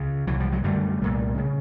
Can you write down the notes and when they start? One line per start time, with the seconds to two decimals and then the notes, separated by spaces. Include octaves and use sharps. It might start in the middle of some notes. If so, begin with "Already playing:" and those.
Already playing: C#2 C#3
0.27 C2 B2 E3 F#3
0.40 F3 G3
0.52 F#3 G#3
0.64 F#2 D3 G3 A3
1.01 C2 A#2
1.38 C#3